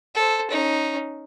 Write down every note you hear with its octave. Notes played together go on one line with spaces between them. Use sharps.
A4 C5
C#4 D#4